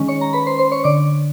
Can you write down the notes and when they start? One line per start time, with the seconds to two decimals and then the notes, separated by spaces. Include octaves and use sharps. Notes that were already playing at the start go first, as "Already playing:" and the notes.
Already playing: D#3 G#3 C#4
0.08 C#5 C#6
0.21 A#5
0.33 B4 B5
0.47 C5 C6
0.58 C5 C6
0.72 C#5 C#6
0.84 D3 D5 D6